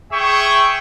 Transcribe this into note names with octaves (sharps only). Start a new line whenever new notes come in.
G#4 E5 G5 C#6